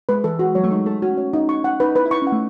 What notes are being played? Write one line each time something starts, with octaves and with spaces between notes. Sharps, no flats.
G#3 B4
E3 A4
G#3 F#4
F#3 C#5
A3
G#3 D#4
A3 A4
C#4 F#4
C#5
D#4
C#6
F#5
D#4 B4
E4 B4
E4
D#4 C#6
C#4 F#5
A3